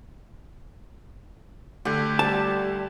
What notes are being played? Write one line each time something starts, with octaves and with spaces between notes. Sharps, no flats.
D3 A3 G4
G3 A5